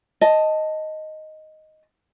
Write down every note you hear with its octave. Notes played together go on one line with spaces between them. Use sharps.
D#5 A5